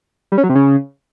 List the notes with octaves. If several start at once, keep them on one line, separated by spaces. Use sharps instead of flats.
G3
C#4
F#3
C3
C#3